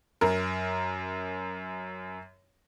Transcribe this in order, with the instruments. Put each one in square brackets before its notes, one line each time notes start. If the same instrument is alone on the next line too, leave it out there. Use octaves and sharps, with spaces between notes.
[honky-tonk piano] F#2 A#4